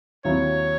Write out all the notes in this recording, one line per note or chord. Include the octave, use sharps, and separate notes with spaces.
D#2 D#3 F#3 C4 E4 C#5